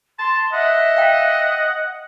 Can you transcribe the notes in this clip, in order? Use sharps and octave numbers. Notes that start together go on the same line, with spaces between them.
A5 C6
D#5 E5 F#5
F5 G5